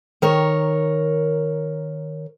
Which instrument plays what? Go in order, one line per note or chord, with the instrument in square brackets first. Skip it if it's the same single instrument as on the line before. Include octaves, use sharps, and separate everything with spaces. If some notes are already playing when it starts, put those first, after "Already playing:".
[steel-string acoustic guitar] D#3 A#4 C#5